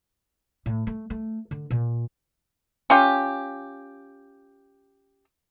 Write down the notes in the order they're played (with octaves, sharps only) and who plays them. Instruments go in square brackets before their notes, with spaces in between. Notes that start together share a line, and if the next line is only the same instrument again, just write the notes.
[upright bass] A2
A3
A3
D3
A#2
[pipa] C#4 F4 G4